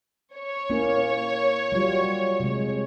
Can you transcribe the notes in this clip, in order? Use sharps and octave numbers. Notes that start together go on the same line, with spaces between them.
C#5
A#3 C#4 E4
F#3 G3 F4
C3 G#3